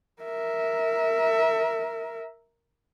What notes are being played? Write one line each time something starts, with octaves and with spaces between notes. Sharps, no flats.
A#4 E5